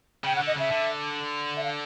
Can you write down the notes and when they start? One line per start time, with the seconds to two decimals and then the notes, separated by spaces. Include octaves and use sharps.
0.24 C#3 G5
0.36 F#5
0.39 D3
0.47 D#5
0.56 C#3 E5
0.71 D3
1.57 E5
1.64 F5